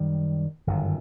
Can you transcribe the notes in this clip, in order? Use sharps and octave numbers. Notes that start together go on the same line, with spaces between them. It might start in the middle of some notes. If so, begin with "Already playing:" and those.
Already playing: F#2 D#3 G3
G1 F#2 D#3